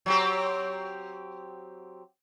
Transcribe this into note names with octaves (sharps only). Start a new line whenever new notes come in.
F#3 C4 G4